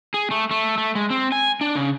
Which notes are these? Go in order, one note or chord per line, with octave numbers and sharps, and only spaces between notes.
G#4
A3
A3
A3
G#3
C4
G#5
D4
C#3